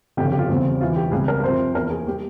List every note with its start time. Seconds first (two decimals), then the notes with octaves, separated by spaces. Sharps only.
0.17 G1 F2 C#3 G4
0.32 G4
0.39 F4
0.49 E2 C#3 G3 C4
0.80 E1 E2 E3 F4
0.96 G4
1.11 C#2 C3 G3 G#4
1.28 A#4
1.43 F2 C3 F3 C5
1.75 E2 E3 A#3 A#4
1.90 G#4
2.07 G3 A#3 G4